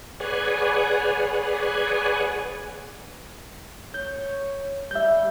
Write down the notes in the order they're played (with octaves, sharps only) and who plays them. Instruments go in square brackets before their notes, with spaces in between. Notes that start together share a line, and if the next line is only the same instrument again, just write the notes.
[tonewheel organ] G#4 B4 C#5 D5 F#5 G#5
[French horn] C#5 [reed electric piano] G6
[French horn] G3 [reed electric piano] E5 G6